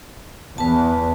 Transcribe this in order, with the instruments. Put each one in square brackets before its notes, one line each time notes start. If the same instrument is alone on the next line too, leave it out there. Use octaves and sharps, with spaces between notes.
[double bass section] E2 [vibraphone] B4 A5